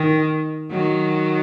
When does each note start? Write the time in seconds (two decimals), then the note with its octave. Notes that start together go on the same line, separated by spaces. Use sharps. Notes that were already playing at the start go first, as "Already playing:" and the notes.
Already playing: D#3
0.70 D#3 F#3